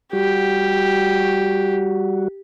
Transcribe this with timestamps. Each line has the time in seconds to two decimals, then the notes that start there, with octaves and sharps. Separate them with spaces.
0.13 G3 F#4 G4